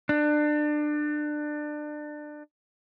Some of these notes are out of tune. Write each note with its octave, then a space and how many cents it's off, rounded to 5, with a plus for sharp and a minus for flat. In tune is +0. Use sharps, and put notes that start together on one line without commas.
D4 +25